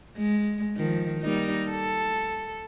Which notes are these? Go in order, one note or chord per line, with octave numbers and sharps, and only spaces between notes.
G#3
D#3 F3
G3 A#3 D#4
A4